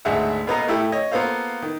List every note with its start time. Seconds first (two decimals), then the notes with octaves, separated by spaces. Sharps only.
0.05 G#1 D2 G#4 E5 F#5
0.47 B2 A#3 B3 A4 D#5 A#5
0.68 A2 A3 E4 G4 A4
0.92 C#5 D#5
1.12 A#3 B3 F4 A4 C5 F5
1.62 D#3